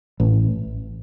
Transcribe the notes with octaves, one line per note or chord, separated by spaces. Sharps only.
A1